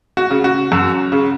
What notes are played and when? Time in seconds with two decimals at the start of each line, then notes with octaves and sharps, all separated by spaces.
0.17 F#4
0.30 C#3
0.44 F#4
0.72 F#2
1.12 C#3